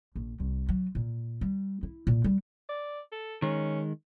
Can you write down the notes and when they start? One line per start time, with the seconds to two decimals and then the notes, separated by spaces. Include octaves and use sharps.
0.16 A#1
0.40 C2
0.69 F#3
0.95 A#2
1.41 G3
1.83 E4
2.07 A#2
2.24 G3
2.69 D5
3.12 A4
3.42 D#3 G#3 C#4